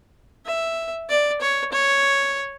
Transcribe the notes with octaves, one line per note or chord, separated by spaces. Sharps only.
E5
D5
C#5
C#5